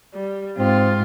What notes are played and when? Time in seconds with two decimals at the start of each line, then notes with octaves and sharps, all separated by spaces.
0.14 G3
0.58 G#2 C4 F4